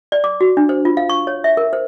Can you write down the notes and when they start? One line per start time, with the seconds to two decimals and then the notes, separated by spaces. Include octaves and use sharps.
0.12 D5
0.24 D6
0.41 F#4
0.57 D4
0.69 C5
0.85 F4
0.97 F5
1.09 C#6
1.27 C#5
1.44 E5
1.57 A#4
1.73 C5